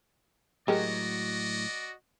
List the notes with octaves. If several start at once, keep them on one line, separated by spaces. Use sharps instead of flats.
A2 F#3 G#3 F#4 G4 A#4 D5 D#5